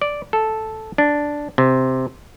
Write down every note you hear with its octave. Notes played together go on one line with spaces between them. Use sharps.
D5
A4
D4
C3